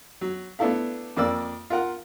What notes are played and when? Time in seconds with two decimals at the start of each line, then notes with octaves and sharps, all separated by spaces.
0.21 F#3
0.59 A3 B3 D4 E4 A4 F5
1.17 F2 A#3 D5 E6
1.70 F4 A#4 F#5